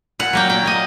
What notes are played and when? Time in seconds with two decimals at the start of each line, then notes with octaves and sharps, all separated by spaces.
0.19 A#2 F#5
0.33 F#3 A#3 G5
0.50 A#2 G5
0.63 F#3 A#3 D#5